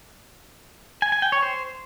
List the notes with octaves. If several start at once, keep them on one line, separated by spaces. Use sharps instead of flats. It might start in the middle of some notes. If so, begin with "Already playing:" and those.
G#5
G#5
G5
C#5
C5